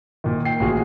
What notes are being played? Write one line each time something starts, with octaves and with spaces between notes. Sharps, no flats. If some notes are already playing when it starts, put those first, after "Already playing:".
A#2 D#3
G5 C7
A1 A#2 F#4 G#4